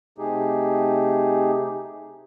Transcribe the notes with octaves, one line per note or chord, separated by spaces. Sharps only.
C3 A3 D#4 G4 G#4